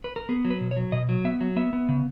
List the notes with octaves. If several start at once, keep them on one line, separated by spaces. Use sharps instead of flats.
B4
A#4
B3 G#4
F#3
B4
B2
C#5
F#3
B2 D#5
F#3
B3 E5
F#3
B3 E5
B3
C#3